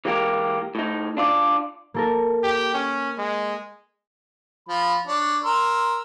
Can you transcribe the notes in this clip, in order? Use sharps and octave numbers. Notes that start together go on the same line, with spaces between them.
E3 G#3 A#3 B3 G4 A#4
A2 D#4
D4 F4 D5
A#3 A4 A#4
G4
C#4
G#3
F3 B5
D4 C#5
A#4 C6 E6